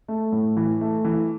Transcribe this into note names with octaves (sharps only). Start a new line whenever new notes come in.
A3
A2
E3
A3
E3